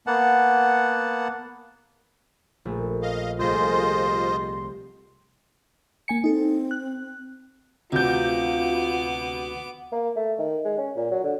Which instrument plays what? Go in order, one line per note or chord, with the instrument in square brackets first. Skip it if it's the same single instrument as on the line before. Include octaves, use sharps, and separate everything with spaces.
[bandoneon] A#3 B3 F#5 A5
[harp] A#1 A3
[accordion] D#5 F5
[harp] C2 A3 G#4 [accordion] F4 C5 D#5 [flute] C6
[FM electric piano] A#3 G#5 C#7
[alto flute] C4 [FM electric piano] D#4 A4
[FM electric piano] F#6
[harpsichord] D2 [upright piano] C3 G6 [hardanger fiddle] B3 D6 [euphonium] F4
[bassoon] A#3
A3
D#3
G#3
C#4
A#2
F#3
D3